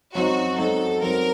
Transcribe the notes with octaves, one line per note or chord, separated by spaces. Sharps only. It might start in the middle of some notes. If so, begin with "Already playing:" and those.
F#2 F#3 C4 D#4 F#4
F#2 F#3 C4 D#4 A4
F#2 F#3 C4 D#4 A#4